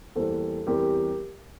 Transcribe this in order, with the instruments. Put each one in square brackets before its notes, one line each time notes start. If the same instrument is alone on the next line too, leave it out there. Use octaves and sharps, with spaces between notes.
[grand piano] E2 E3 G3 A#3 [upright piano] A4 C5
[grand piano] E2 E3 G3 C4 [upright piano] G4 A#4